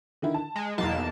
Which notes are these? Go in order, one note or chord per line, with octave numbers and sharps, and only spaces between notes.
D3 D#3 E4
A5
G#3
B1 E2 A#3 A5